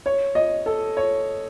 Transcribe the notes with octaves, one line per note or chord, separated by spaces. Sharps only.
C#5
D#5
A4
C#5